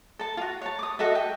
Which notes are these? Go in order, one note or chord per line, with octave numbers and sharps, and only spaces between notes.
A4 A5
F4 F#4
C#5 A5
D6 D#6
F#4 A4 D#5 E5
G5